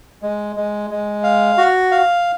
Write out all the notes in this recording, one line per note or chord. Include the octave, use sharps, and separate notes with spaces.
G#3
G#3
G#3
F5
F#4
F5